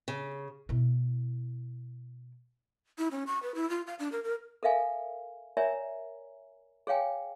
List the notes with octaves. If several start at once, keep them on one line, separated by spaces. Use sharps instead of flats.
C#3
B2 E4
E4
C#4
C#6
B4
E4
F4
F5
D4
A#4
A#4
A4 A#4 E5 F5 G#5
A#4 C#5 D5 E5 G#5 A#5
G#4 C#5 F5 G5 G#5